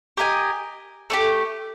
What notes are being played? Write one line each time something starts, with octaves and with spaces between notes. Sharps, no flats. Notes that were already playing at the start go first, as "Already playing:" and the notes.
G4 A#4 D#5 G#5
A3 D4 G4